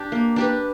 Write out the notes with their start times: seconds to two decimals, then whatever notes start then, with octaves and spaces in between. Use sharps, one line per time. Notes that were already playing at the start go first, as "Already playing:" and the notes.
Already playing: D4 G4
0.12 A#3
0.36 D4 G4 B4